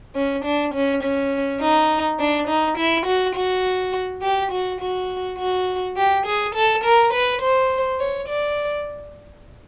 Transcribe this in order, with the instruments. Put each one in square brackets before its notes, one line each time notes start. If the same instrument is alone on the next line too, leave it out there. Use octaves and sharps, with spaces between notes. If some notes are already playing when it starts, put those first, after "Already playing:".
[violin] C#4
D4
C#4
C#4
D#4
D4
D#4
E4
F#4
F#4
G4
F#4
F#4
F#4
G4
G#4
A4
A#4
B4
C5
C#5
D5